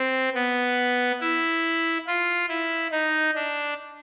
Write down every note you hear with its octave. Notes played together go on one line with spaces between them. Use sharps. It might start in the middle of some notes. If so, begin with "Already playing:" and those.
Already playing: C4
B3
E4
F4
E4
D#4
D4